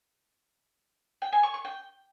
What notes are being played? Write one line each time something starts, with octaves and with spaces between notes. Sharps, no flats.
G5
G#5
C#6
C#6
G5